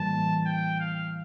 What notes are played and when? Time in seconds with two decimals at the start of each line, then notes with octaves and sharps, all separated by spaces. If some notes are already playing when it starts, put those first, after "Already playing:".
Already playing: A2 E3 G3 A#3 A5
0.46 G5
0.80 F5